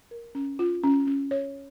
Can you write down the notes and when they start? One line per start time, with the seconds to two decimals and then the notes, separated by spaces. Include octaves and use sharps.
0.11 A#4
0.35 C#4
0.59 F4
0.83 C#4
1.07 C#4
1.31 C#5